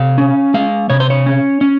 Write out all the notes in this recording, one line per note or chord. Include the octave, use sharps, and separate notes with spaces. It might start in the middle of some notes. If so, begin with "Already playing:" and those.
Already playing: C3 F5
C#4
G#3 F5
C3 C#5
C5
C#5
C#4
C#4